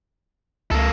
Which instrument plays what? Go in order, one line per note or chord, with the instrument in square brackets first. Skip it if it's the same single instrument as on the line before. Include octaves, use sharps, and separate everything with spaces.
[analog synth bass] C#2 [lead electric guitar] A#3 A4